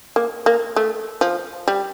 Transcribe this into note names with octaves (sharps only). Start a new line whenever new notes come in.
A#3
A#3
A3
F3
G3